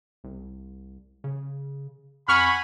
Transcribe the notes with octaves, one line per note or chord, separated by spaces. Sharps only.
C2
C#3
F2 F#5 G#5 B5 C#6 F6